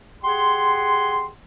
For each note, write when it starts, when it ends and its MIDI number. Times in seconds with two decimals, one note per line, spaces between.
0.24 1.28 67
0.24 1.28 68
0.24 1.28 78
0.24 1.28 84